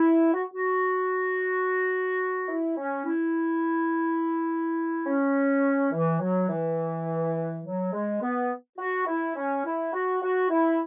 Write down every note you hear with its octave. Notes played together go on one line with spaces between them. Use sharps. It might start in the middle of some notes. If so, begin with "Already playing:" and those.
Already playing: E4
F#4
F#4
E4
C#4
E4
C#4
E3
F#3
E3
F#3
G#3
B3
F#4
E4
C#4
E4
F#4
F#4
E4